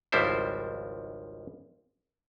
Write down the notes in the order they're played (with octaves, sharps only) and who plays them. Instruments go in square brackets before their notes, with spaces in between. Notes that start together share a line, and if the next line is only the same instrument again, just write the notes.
[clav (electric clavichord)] G#1 C#2 F3 G3 E4 C5